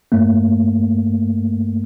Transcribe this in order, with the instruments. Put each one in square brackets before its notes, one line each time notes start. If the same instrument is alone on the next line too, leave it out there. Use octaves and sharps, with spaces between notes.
[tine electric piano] G2 A3 A#3